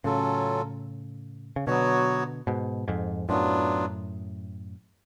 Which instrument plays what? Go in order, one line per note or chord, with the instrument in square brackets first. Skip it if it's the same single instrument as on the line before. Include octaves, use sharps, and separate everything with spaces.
[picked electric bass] A2 C#3 [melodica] F#3 C#4 F4 A4
[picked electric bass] C#3
[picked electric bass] B2 D3 [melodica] F#3 B3 F#4 C#5
[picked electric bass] G#2 B2
F2 G#2
[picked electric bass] F#2 A2 [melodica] F#3 B3 D4 F4